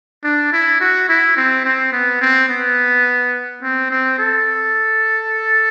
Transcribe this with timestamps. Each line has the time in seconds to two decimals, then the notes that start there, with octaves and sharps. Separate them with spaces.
0.24 D4
0.52 E4
0.80 F#4
1.09 E4
1.37 C4
1.65 C4
1.93 B3
2.21 C4
2.49 B3
3.62 C4
3.91 C4
4.18 A4